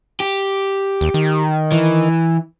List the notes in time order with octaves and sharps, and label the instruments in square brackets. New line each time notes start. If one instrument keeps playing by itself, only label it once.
[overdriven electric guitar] G4
[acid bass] D#2
D#3
[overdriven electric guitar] E3